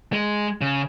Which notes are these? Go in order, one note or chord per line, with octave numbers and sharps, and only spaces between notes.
G#3
C#3